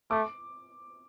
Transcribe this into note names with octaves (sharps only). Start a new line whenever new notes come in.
A3 D6